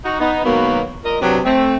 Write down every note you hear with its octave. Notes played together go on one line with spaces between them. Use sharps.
D#4 F#4
B3 D#4
B2 D#3 F#3 G#3 A#3 B3
A#2 A#4 D#5
C3 F#3 B3 D4
A3 C4